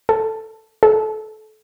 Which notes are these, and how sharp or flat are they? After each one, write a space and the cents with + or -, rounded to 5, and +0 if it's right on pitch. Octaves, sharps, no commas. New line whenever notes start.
A4 +5
A4 -25